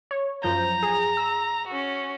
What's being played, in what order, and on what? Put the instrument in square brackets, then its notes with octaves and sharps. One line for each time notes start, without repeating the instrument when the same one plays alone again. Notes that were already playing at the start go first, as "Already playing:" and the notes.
[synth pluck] C#5
[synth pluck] F#2 F3 G6 [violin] A#5
[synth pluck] G#4
E6
[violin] C#4 F#4